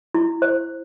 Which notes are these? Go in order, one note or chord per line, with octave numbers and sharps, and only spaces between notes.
E4
C5